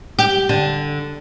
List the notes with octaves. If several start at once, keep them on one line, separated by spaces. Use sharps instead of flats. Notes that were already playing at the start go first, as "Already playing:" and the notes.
G4
D3